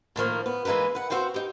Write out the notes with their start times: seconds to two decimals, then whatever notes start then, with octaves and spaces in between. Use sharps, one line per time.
0.16 A2 D#3 F3 A#3
0.46 B3
0.65 E3 G#3 A#3 D#4 B4
0.95 B4 F#5
1.10 C4 F#4 C5 F5 G5
1.34 D#4 G4